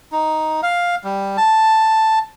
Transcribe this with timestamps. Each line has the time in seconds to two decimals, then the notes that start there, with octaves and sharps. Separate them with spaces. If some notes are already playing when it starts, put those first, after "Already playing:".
0.12 D#4
0.63 F5
1.04 G3
1.37 A5